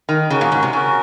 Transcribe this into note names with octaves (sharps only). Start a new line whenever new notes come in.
D#3
C#3 C#4 F#4 A#4
A#2
G#2
C3
C#3 C#4 F#4 A#4